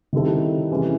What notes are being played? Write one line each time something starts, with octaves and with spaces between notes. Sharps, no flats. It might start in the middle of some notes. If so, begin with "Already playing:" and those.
D#3 G3 C4 E4 A4
C3 E3 G#3 C#4 E4